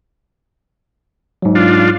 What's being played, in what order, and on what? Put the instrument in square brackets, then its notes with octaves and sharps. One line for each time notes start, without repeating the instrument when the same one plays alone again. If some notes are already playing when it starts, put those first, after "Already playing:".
[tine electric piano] G#2 F#3
[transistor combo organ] D4 F4